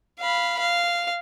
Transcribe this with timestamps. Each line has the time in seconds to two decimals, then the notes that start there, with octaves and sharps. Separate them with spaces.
0.20 F5 B5
0.59 F5